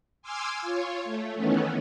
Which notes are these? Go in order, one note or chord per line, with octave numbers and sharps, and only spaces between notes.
G#5 C6 D6 E6 F6 G#6
F4 C#5
A3
D#3 E3 A3 B3 C#4